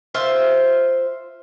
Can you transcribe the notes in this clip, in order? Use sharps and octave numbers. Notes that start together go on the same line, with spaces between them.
F4 C5 E5